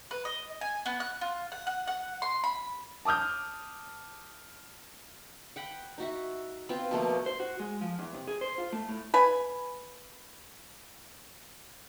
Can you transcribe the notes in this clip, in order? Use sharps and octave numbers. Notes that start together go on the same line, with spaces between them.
B4
D#5
G#5
B3
F#6
F4
F#5
F#5
F#5
C6
B5
A5 D6 D#6 F6 G6
F#5 G5 B5
D#4 F#4 E5
B3 C4 F4 G5
B2 F3 A3 A#3
C5
F#4
G#3
F3
E2
C3
G#4
C5
F4
A3
A2
B4 G#5